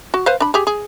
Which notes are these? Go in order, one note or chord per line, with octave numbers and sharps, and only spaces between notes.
F#4
B4 C5 F5
D4 B5
G4 G#4
G#4